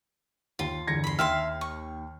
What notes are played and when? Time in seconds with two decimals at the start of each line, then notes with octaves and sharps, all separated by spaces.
0.59 D#2 F4
0.87 G1 E2 G#6 A#6 C#7
1.04 B5 C6
1.19 D#2 E5 F5 G5 C6 F6
1.61 C#6